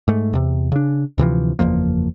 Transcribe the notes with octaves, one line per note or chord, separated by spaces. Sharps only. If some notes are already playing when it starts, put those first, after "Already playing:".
G#2 A3
E2 C3
C#3 D4
D2 C3 E3 F3
F#1 E2 F3 A#3